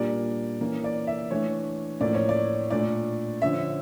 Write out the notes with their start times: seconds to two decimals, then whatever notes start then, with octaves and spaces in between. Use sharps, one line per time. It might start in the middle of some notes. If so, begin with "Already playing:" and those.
Already playing: A#2 G3 A#3 D4 D5
0.60 E3 A#3 C#4
0.84 D5
1.07 E5
1.31 E3 A3 D4 C#5
2.00 A2 F3 A#3 C#4 D5
2.15 C#5
2.29 D5
2.71 A#2 A3 D4 D5
3.42 D3 F3 C#4 E5